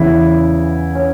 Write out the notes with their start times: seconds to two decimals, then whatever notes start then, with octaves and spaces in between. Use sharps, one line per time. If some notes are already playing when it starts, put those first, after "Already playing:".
Already playing: E2 C#3 E3 E4
0.95 C#4